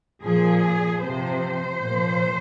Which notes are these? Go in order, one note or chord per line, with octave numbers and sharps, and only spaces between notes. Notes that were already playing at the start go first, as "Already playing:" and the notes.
A#2 F3 G#4
C3 F3 C5
A#2 F3